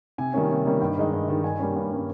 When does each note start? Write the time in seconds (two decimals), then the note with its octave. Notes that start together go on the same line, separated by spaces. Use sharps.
0.18 C3 G#5
0.34 D#3 G3 A#3 C#4
0.50 C3
0.66 D#3 G3 A#3 C#4
0.81 G2 G5
0.98 D#3 G#3 D#4
1.14 G2
1.29 D#3 G#3 D#4
1.44 G2 G#5
1.60 G3 A#3 C#4
1.76 G2
1.91 G3 A#3 C#4